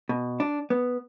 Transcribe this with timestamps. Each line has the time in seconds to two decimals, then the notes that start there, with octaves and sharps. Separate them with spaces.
0.09 B2
0.40 D4
0.70 B3